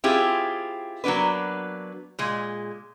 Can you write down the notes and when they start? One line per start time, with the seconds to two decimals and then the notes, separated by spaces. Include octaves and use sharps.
0.04 C4 E4 F4 G4 G#4
1.04 F#3 A#3 B3 D4 B4
2.19 A#2 G#3